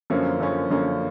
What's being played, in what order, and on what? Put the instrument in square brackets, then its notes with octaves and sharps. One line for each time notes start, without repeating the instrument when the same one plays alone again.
[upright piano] F#2 D3 F3 A#3 C#4
F#2 D3 F3 A#3 C#4
F#2 D3 F3 A#3 C#4